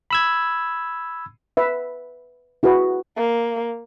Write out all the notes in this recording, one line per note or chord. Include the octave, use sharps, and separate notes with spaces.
B5 E6 G#6
B4 E5
E4 F#4 G#4 B4
A#3